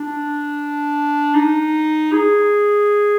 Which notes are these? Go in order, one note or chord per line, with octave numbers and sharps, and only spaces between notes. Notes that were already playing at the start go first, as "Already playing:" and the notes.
Already playing: D4
D#4
G#4